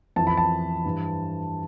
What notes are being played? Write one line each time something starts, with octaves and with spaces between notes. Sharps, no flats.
F2 E3 A5
B5
A5
G2 E3